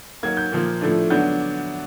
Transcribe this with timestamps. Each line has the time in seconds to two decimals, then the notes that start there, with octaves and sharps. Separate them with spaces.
0.23 D#3 F#3 A#3 G#6
0.37 G6
0.52 A#2 F3 A#3
0.81 A2 F3 A3 D4
1.10 D3 F#3 B3 D4 G6